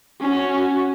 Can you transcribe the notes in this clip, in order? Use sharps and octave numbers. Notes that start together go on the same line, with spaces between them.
C#4 F#4